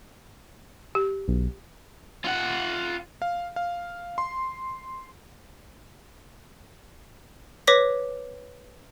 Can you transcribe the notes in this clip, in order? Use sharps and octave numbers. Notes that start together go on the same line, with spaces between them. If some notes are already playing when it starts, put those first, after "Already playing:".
G4
B1
F4 F#5
F5
F5
C6
B4 C#5 D6 A#6 B6